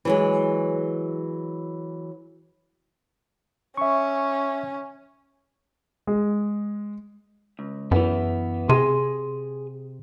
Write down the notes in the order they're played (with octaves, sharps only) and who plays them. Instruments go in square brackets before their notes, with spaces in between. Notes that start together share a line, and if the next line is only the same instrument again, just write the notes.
[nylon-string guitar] E3 F#3 G#3
[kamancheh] C#4 [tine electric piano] E5 C#6
[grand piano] G#3
[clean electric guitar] C#2
[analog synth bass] F#2 [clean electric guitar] E3 B3
[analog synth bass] C3 [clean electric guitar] G#4 C6